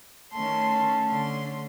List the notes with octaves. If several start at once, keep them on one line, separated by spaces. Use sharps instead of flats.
D#3 A3 C#4 A5 C6
D3 C6